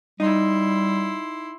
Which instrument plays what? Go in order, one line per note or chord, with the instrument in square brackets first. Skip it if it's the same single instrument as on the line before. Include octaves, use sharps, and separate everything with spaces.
[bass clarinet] G3 [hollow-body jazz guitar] D#4 [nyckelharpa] E4 C6